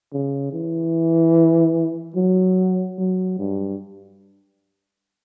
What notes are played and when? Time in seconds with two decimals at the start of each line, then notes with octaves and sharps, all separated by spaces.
0.13 C#3
0.53 E3
2.16 F#3
2.98 F#3
3.39 G2